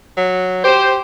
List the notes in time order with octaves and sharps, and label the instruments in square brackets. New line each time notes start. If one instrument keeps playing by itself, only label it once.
[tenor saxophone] F#3
[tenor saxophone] G4 [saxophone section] C5